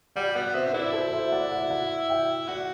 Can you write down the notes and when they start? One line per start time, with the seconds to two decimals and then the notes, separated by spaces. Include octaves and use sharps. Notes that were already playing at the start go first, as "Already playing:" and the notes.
0.16 G3 D5 F#5
0.35 B3 D5 F#5
0.54 C4 C5 E5
0.67 D4
0.73 E4 B4 D5
0.93 A4 C5
1.13 C5 E5
1.32 D5 F#5
1.52 D5 F#5
1.70 D5 F#5
2.10 E5 G5
2.48 F#4 D5 F#5